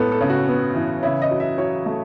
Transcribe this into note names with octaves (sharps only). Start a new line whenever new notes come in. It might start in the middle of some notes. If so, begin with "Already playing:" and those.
Already playing: A2 G#3 B3 A4
A4
C#3
F#4
B3
E3
C#3 E4
D#5
F#3
E5
F#3 C#5
A3